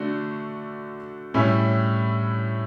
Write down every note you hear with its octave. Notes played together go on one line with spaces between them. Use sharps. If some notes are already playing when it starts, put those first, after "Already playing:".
Already playing: D3 A3 D4 F#4
A2 G3 C#4 E4